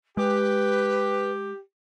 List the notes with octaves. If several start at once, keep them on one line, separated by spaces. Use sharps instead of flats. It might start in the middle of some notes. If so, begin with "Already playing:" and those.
G#3 G4 B4